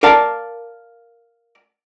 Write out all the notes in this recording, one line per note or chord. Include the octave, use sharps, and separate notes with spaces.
A#4 D5 F5 A5